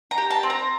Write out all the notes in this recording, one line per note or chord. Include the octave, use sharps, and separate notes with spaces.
A#5
G4
A5
C4
A#5